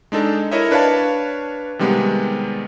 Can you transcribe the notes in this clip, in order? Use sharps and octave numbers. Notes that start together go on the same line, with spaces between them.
G#3 D4 D#4 A4
E4 A#4 C#5 D#5 E5
D4 B4 C#5 F5 A5
C3 D#3 G3 G#3 B3